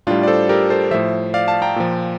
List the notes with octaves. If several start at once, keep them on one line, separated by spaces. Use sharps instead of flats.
A2 G3 D4 F4
D5
A4 C5
G4 A#4
A4 C5
A2 F3 C5 E5
D5 F5
F5 A5
G5 A#5
A#2 F3